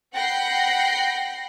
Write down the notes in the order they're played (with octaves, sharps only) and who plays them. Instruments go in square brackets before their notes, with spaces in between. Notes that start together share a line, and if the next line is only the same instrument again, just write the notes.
[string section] F#5 G5 B5 G6 A#6 C7